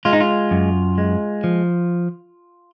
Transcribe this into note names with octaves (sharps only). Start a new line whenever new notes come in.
G#3 F4
D#4
F4
F#2
G#3
F3